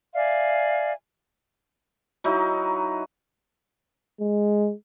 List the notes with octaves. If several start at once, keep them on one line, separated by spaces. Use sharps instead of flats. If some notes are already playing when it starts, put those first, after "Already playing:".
D5 E5 F5 G#5
F#3 D#4 E4
G#3